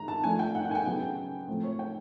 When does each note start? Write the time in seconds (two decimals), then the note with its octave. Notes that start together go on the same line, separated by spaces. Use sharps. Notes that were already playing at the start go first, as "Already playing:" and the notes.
Already playing: D#3 G#3 A#5
0.08 A5
0.24 F3 A3 D4 G#5
0.39 G5
0.55 F#5
0.65 F#5
0.71 G#5
0.75 G5
0.86 C#3 F#3 B3
1.48 A2 F3 A3 C4
1.63 C#5
1.79 G5